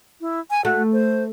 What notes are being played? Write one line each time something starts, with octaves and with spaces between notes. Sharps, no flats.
E4
G#5
A3 F#4
C5